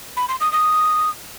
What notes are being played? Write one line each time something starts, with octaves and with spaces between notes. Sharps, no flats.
B5
C6
D#6
D#6